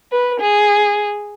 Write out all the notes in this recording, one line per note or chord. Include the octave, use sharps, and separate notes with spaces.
B4
G#4